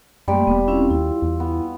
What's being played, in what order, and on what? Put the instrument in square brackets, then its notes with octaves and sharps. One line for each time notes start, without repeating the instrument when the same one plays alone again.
[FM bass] F#2 [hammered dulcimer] G3 [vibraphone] A3 A#3 C6
[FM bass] E1 [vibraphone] B3
[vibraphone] C4 C#4 E4 [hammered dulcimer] F4
[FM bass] D#2 [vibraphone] E4
[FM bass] E2
[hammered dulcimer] B3